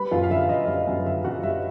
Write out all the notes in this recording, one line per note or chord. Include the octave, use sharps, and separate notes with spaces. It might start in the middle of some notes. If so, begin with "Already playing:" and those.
Already playing: G3 B4 B5
F#2 F4 F5
F5
D3 E5
F#2 D#5
G3 E5
D#5
F#2
D3 E5
F#2 F#4 F#5
G3 E5